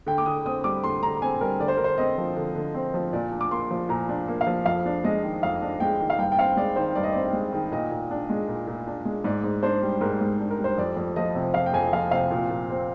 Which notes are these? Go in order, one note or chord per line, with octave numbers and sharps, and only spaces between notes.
D3 G5
D6
D3 D#6
C4 D#6
G3 D6
D3 C6
D3 A#5
C4 G#5
G3 A#4
D3 D5
C5
D3 A#4
C5
C4 D#5
F3
D3
D3
C4
F3
A#2 D5
D4
D6
A#3 C6
F3
A#2 A#5
D4
A#3
F5
F3
F2 F5
D4
G#3 D#5
D#3
F2 F5
D4
G#3 G5
D#3
F5
G2 G5
G5
C4 F5
G#3 D5
D#3 C5
G2 D5
D#5
C4 D5
G#3
D#3
A#2 D#5
A#2
D4
G#3
A#2
A#2
D4
G#3
G#2 D5
G#2
D4 C5
G3
G#2 A#4
G#2
D4
A#4
G3
C5
F2 D5
F2
F3 D#5
C3
F2 F5
G5
F2 G#5
F3 F5
C3 F5
A#2
A#2
C4